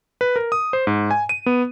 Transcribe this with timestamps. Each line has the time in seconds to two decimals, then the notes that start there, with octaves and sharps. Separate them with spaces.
0.21 B4
0.36 A#4
0.52 D#6
0.73 C5
0.87 G#2
1.11 G#5
1.29 D#7
1.46 B3